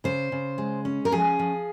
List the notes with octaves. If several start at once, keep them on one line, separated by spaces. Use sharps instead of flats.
C#3 C5
C#3
G#3
C#4
A#4
F3 G#4
F3